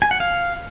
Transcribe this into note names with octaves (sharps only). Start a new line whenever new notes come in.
G#5
F#5
F5